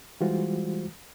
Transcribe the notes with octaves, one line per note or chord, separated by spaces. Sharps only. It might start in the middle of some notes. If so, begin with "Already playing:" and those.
E3 G3 G#3 F4 F#4 C5